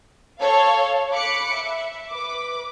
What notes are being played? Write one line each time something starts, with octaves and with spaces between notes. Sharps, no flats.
A4 C#5 F5
B5 D6 F#6 C#7
E5
B4 D6